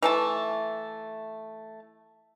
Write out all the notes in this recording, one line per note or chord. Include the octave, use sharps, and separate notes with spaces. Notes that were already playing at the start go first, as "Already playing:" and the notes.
E3 A3 A5